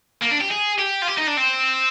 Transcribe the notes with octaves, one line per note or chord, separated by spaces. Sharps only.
A#3
D4
G4
G#4
G4
F4
G4
D#4
D4
C4